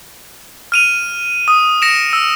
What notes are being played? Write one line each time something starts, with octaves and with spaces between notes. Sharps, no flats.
F6 D#7 F7
D#6
A#6 C#7 D7 E7
E6